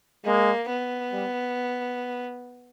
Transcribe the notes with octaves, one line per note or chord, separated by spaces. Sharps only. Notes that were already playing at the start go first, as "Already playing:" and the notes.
G#3 A#3
B3
G3